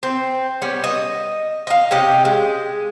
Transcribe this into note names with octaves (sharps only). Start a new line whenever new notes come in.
C4
G3 B3 C#4
D#5
D#5 F5
C3 C#4 G4 D#5
G#3